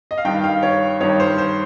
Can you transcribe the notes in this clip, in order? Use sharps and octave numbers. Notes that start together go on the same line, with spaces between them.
D#5
F5
G2 D#3 G5
F5
C#5
G2 D#3 C#5
C5
C5